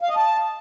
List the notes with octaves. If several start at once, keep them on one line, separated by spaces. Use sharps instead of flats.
F5
D#5
A5